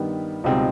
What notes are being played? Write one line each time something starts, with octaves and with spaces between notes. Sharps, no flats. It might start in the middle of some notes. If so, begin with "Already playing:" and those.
Already playing: G2 D#3 G3 B3
C#2 B2 G3 C4 D#4